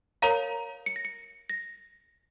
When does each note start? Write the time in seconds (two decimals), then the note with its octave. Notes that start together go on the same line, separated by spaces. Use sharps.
0.22 A#4 C#5 F5 A#5
0.86 C#7
0.96 A#6
1.05 C#7
1.50 A#6